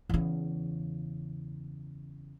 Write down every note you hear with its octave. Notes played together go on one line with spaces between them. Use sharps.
E2 C#3